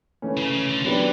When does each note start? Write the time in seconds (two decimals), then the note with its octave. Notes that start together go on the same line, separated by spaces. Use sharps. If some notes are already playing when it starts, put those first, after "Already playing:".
0.22 E3 A3 C#4
0.37 C#3
0.53 C#3
0.69 D3
0.84 E3 F#3 B3 D4 G4